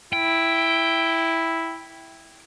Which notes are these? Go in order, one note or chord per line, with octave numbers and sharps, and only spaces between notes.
E4 G5